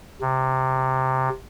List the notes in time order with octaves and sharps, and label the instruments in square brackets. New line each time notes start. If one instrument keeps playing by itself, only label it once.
[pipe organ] C3